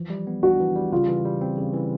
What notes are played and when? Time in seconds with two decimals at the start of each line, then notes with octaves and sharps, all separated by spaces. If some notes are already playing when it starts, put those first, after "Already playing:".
Already playing: E3 F3
0.10 G3
0.27 B3
0.43 D4 F#4
0.60 E3
0.76 G3
0.93 C#3 F4
1.08 E3
1.25 G3
1.41 C4
1.58 C#3
1.74 E3